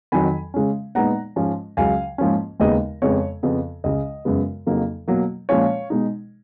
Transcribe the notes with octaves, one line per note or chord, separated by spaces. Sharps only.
F2 D#3 F#3 G#5 B5
C#3 G#3 C#4
A#2 G#3 B3 D#4 F#5 A#5
G#2 F3 G#3 C#4
C#2 C#3 F#3 F5 G#5
G#2 F3 A#3 C#4
D#2 C#3 G#3 B3 D#4 D#5
F2 C#3 G#3 B3 C#5
F2 C#3 F3 B3
C#2 C#3 G#3 D#5
F#2 C#3 G#3 B3
F2 C#3 F#3 A#3 D#4
B2 F#3 A#3
A#2 F3 G#3 C#4 C#5 F5
B2 G#3 D#4